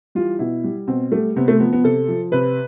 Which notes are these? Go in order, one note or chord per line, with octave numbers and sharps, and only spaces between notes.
E3 G3 F4
B2 E4
G3
B2 C4
G3 A3
C3 B3
A3
F3 B3
B3
C3 A4
F3
C3 B4